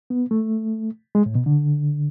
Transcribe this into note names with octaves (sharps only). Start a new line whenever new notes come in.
B3
A3
G#3
A2
B2
D3